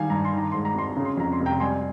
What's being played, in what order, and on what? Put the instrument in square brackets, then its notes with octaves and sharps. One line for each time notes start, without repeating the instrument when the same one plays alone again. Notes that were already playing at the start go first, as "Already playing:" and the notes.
Already playing: [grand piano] D#3 G3 F5 G#5
G2 A#5
C6
D#3 A#5
G#2 C6
A#5
G#1 C6
C#3 A#5
C6
F2 A#5
C6
F1
G5 A#5
G3 G#5 C6